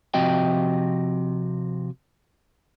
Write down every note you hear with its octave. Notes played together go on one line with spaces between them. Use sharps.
C3 F3 C4 F#4 D#5 G5